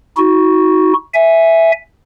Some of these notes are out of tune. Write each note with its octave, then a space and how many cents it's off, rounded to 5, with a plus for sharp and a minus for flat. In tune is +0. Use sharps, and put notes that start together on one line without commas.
D#4 +45 F#4 +0
E5 +0 G#5 +0